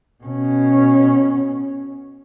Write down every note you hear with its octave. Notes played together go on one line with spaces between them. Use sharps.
B2 C#4